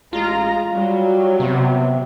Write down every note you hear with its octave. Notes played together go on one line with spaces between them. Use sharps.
A1 G#3 F4 A#5
F#3 G3
C3 B3